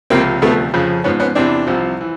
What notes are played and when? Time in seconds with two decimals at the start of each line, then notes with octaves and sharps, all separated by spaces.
0.10 C#2 C3 F3 A#3 C4
0.42 D2 C3 F3 A3 B3
0.73 F2 C#3 F3
1.04 G#2 F3 B3 C#4
1.20 B3 C#4
1.35 E2 C3 E3 C4 D4
1.67 C2 C3 F3
2.01 E3